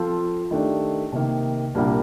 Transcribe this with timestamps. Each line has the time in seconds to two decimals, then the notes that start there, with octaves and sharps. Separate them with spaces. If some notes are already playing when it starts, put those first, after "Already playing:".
Already playing: F3 C4 F4 A4 C5
0.51 D#3 A3 D4 G4
1.12 C3 D#3 A#3
1.75 C2 A#2 G3 A#3 D4